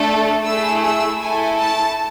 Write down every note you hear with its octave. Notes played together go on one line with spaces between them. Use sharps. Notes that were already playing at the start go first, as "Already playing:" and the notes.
Already playing: A3 D4 A4
A3 E4 G#4 E6
E6
A3 E4 A4 G#5
A5